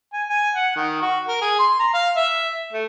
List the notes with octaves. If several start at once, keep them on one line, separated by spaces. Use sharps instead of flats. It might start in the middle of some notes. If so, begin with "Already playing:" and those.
G#5
G#5
F#5
D#3
F#4
A#4
G#4
C6
A#5
F5
E5
A3